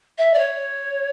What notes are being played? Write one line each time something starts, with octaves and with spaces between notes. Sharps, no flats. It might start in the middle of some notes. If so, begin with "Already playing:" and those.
E5
D5
C#5